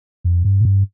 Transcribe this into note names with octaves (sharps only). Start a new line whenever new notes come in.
F2
G2
A2
G2